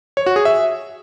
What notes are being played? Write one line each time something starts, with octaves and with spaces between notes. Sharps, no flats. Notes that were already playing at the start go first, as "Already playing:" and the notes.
C#5
F#4
G#4
E5